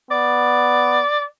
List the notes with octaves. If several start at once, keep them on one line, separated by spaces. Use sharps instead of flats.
B3 D5